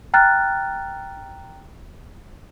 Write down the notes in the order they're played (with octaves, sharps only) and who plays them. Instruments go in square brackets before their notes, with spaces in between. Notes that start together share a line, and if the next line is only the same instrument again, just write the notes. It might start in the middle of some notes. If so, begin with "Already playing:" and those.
[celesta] G5 A#5 F6 F#6 A6